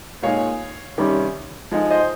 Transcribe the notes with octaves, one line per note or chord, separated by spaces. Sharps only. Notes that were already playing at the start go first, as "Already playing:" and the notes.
A#2 G#3 D#4 C#5 F5
C3 D#3 G3 C#4
F3 G#3 D#4
C5 D#5